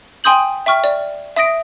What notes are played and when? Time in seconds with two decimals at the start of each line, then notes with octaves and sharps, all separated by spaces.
0.24 G5 G#5 C6 D#6 G6 F#7
0.66 E5 G5 C#6 F6
0.84 D5
1.36 E5 D#6 A#6 D7